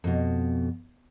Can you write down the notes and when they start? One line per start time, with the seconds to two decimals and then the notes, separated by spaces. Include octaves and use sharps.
0.04 F2 B2